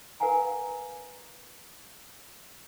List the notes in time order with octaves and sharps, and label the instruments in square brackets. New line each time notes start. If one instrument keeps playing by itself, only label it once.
[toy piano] A#4 B4 F5 F#5 G#5 A#5